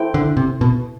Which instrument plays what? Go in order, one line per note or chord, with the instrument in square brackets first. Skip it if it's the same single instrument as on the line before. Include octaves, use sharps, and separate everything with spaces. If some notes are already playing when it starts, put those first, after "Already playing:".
Already playing: [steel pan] E4 A4 C5 G5
[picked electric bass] D3
C3
B2